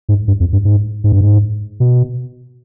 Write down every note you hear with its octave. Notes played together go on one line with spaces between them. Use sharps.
G#2
G2
F2
G2
G#2
G#2
G2
G#2
B2